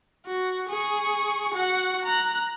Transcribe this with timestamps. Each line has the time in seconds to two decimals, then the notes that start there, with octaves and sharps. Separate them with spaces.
0.26 F#4
0.69 G#4 C#6
1.54 F#4 F#5
2.05 A#5 F#6